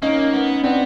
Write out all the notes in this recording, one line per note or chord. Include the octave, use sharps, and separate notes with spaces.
A#3 C#4 D#4
B3
B3 C4 D4